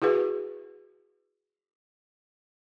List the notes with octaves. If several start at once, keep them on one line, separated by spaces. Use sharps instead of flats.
E4 F#4 G#4 B4